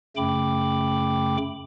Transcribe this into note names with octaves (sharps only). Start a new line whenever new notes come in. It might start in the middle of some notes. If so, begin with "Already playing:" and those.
F#2 C#3 A3 G5 B5 D6